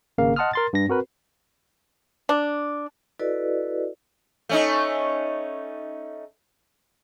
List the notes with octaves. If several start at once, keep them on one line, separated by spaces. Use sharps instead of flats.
G#1 C#3 A#3 A#4 F5
D#5 F#5 A5 C6 D#6 F6
A#4 C6 A6
G2 D4 A#6
C4 F#4 A#4 B4
D4
E4 F#4 A4 B4 D5 D#5
A3 C#4 D#4